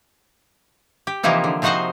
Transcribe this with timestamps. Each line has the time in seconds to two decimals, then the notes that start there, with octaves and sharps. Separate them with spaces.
1.07 G4
1.23 C3 E3 F3 A#3 D#4 E4
1.44 D3
1.62 C3 F3 D#4 F#4 C5 F#5